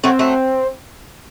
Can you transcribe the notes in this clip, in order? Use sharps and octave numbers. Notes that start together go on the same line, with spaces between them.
F#3 A3 C4
F#3 A3